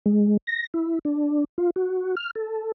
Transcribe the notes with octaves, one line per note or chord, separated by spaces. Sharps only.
G#3
A#6
E4
D4
F4
F#4
F6
A4